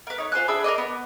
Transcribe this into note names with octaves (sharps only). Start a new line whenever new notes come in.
A#4 B4
D#4 C#5
F4 C5 G#5 F#6
D4 G#4 E5 B5
A#4 B4 D5 D#5
B3